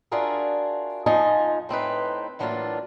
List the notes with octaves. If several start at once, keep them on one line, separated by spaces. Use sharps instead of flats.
D4 F4 F#4 G#4 A#4 E5
F2 F3 D#4 D#5 G#5 A5
A2 C4 D#4 B4
A2 E3 F#3 A#3 D4 F4